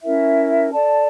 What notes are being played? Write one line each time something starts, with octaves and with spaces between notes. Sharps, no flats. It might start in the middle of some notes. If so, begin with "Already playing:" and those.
C#4 E4 A#4 E5
A4 D5 A5